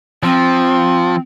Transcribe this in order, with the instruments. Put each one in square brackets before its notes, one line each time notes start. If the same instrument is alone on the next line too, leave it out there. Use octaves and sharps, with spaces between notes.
[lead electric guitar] F3 [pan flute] C4